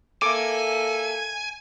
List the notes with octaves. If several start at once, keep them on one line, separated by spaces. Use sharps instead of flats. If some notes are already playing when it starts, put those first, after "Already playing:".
A#3 A4 E5 G#5 D6